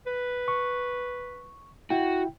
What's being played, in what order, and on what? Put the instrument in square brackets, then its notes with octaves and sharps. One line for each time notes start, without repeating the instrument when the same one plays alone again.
[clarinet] B4
[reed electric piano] C#6
[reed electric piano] E4 G5 [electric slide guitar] F#4